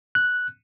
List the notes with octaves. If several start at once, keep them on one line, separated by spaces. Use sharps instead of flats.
F#6